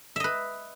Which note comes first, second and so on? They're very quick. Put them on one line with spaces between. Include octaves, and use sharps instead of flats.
E5 D#5 B4